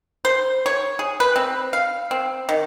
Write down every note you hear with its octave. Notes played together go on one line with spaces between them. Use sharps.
C5
C#5
G#4
B4
C4
F5
C4
D#3